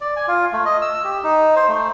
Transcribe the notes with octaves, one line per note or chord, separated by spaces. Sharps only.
D5
G#5
F4
A3
D#5
E6
G4
D#4
C5
A3